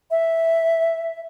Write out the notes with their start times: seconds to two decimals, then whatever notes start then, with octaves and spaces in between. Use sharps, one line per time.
0.11 E5